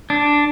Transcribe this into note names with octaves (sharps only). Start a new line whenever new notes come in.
D4